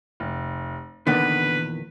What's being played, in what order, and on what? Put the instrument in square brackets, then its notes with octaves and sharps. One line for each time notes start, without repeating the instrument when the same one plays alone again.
[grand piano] F1
[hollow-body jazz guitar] E2 A#2 D#3 [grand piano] D3 B3 [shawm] B4